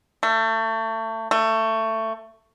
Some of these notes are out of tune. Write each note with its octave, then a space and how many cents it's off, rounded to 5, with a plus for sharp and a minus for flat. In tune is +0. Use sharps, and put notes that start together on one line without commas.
A3 +30
A3 +20